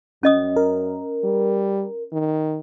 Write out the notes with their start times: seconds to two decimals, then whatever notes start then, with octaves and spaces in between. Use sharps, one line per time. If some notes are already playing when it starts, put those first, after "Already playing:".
0.23 F#2 C#4 D#5 D#6
0.56 A#4
1.24 G3
2.13 D#3